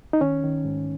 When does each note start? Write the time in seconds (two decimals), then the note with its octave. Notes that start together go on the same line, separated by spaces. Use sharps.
0.13 D#4
0.21 D#3 C#4
0.43 D#3
0.65 G#2